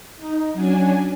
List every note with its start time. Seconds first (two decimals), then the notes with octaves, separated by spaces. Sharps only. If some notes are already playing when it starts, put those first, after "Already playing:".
0.17 D#4
0.53 F#3 C#4 D4 G#5